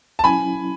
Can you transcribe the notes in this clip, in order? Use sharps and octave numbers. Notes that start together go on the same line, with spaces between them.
A5
F#3 C#4 E4 G#5 B5